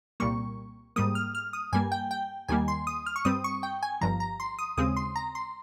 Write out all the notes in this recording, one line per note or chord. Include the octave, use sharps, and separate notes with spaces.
C2 A#2 G3 A#3 C#6
G#2 G3 A#3 D#6
F6
F6
D#6
G2 G3 A#3 G#5
G5
G5
D#2 D#3 G3 A#3 G#5
C6
D#6
F6
C#6
G2 G3 C4 D#6
C#6
G5
G#5
G1 G2 F3 A#5
A#5
C6
D#6
D#2 C#3 G#3 C4 D#6
C6
A#5
C6